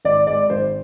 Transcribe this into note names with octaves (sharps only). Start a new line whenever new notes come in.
G#1 D5
G#3 D5
G#1 C5